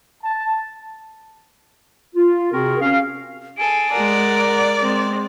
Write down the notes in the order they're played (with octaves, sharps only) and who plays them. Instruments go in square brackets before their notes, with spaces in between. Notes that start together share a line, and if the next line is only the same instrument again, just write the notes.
[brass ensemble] A5
[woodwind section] F4
C3 C4 F#4 G#4 A#4
C#4 F5
[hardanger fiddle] G#4 A4 [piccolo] D7
[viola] G#3 F#5 [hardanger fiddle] A#4 [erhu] D5
[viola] G#3 C4